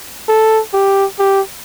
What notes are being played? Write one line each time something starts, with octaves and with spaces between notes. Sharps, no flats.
A4
G4
G4